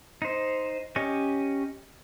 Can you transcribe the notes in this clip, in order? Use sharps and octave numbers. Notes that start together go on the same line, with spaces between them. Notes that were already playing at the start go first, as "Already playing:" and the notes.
D#4 C5
C#4 G4 C#5 D#5 G#5